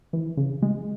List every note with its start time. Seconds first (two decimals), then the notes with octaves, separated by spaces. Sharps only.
0.13 E3
0.37 C#3
0.62 G#3